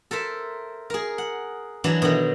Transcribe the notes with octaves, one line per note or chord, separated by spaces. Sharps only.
A4 A#4 C5 E5
G#4 A#4
F#5
E3 F#3 D4 E4
B2 D3 D#3 F#3